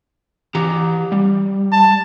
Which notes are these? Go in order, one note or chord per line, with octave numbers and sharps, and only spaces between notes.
E3 G4 A#5
G3
A5